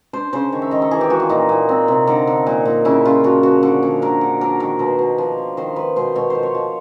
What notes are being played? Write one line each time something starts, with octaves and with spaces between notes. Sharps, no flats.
D4 C5
C#3 C5
D#3 C#5
E5
D#3 D#5
A4
E3 G#4
G4
E3 F#4
F4
A#2 D#4
A#2
C4
C3
D3 D#4
D3
A#2
A#2
C#3 E4
C#3 F4
F3 F#4
F3 F#4
D3
D3 G#4
D3 A#4
D3
D4 A#4
D#3 A#4
B2 C5
B2
F3
F3
D#3 C5
D#3 B4
B2 C5
B2 C#5
F3 C5
C#5
F3